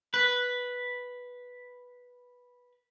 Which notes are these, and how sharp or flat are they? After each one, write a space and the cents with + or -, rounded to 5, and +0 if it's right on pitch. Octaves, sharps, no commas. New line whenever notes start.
B4 -5